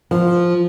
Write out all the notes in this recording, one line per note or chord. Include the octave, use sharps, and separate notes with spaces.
F3